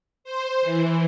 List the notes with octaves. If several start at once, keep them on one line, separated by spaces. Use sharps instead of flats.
C5
E3